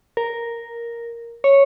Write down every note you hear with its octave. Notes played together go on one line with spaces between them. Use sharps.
A#4
C#5